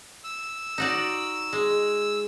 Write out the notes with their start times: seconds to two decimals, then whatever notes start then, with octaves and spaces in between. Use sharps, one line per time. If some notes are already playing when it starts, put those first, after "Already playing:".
0.24 E6
0.78 D#4 F#4 D5
1.53 G#3